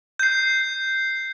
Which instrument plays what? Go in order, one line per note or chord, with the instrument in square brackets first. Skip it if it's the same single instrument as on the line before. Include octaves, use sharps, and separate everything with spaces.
[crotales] G6 C7